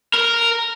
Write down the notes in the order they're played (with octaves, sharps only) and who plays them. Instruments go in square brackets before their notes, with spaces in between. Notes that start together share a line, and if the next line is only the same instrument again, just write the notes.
[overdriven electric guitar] A#4